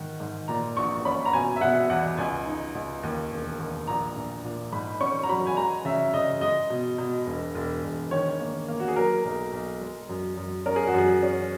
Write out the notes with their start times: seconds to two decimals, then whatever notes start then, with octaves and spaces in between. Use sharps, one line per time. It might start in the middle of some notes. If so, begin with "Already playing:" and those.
Already playing: G#2 D#3 F#5
0.20 G#2
0.48 A#2 A#5
0.77 A#1 C#6
1.05 C#4 B5
1.26 A#5
1.33 B2 G#5
1.56 E5
1.61 B2 F#5
1.90 E2 F#5
2.18 C#2 G#5
2.46 D#4
2.75 C#2
3.03 D#2
3.31 E1
3.59 D#2
3.87 A#1 A#5
4.16 A#1
4.44 A#2
4.72 G#2 B5
5.00 C#4 C#6
5.23 A#5
5.29 F#3 B5
5.47 G#5
5.57 G#3 A#5
5.85 C#3 E5
6.14 C#3 D#5
6.41 G#3 D#5
6.70 B2
6.98 B2
7.27 E1
7.55 E1
7.83 E1
8.11 D#3 C#5
8.40 A#3
8.68 A#3
8.80 F#4
8.88 G#4
8.96 F#3 A#4
9.25 B1
9.53 B1
9.81 G#3
10.09 F#2
10.37 F#2
10.66 C#4 A#4
10.76 G#4
10.87 F#4
10.94 F#2 G#4
11.23 C#4